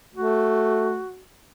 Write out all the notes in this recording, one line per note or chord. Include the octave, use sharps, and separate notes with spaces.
A3 F#4